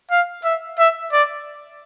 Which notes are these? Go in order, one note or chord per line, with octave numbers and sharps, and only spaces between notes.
F5
E5
E5
D5